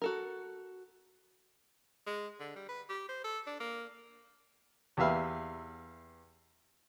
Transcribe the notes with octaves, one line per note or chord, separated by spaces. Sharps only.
F#4 A4 A#4
G#3
D3
G3
B4
G4
C5
A4
D4
A#3
E2 G4 B4 E5 F5 B5